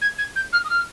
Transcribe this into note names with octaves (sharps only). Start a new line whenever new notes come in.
G#6
G#6
G6
F6
D#6
F6